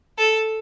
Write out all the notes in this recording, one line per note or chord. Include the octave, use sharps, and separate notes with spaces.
A4